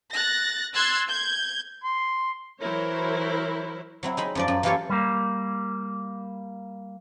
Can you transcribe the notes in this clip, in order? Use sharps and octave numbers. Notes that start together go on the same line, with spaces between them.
F#6 A6 A#6
C6 E6 F#6 G#6 A6
G6 G#6
C6
E3 F#3 E4 A#4 C5 C#5
F#3 C4 E4
G#3 D#4 B5
F#2 F3 D5
F#2
E3 A#3 F4 G4 A4 C#5
G3 A#3